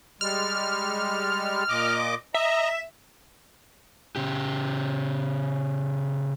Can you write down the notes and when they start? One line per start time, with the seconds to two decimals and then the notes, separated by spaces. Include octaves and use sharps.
0.21 G3 G#3 F6
1.69 A#2 D#5 D6
2.34 D#5 E5 A#5
4.16 C#3 G4